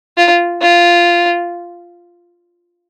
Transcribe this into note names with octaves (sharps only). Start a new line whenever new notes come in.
F4
F4